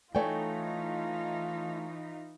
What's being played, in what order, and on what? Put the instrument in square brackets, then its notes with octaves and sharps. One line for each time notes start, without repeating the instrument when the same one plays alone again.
[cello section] E3 D#4 [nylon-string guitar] A3 G5 [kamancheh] F4 [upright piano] C#5 G#5